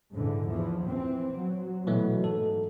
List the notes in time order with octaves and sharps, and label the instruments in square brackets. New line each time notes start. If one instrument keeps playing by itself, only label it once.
[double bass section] G#2 D3 E3
E2 E3 F3
E3 C4
F#3
[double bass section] B2 [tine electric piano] E3 F#3 A3
[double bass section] G#2 [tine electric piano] A4